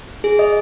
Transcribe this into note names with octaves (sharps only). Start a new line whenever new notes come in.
G#4
D#5